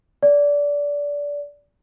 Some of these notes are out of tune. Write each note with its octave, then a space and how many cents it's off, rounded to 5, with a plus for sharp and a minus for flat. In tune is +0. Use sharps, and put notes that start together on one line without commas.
D5 -20